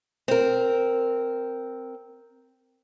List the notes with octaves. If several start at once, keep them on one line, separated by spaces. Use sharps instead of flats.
C4 A#4